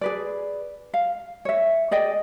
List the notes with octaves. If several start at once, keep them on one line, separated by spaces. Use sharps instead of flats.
G#4 B4 D5
F5
C#5 E5
G#4 D5 D#5 G5